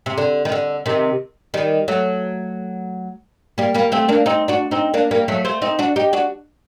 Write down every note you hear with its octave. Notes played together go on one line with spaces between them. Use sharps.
C3
D3
D#3
D3
C3 D#3
D#3 G3
F#3 A3
G3 A#3
G3 A#3
A3 C4
A#3 D4
C4 D#4
D4 F#4
C4 D#4
A#3 D4
G3 A#3
F#3 A3
A3 C4
C4 D#4
D4 F#4
D#4 G4
D4 F#4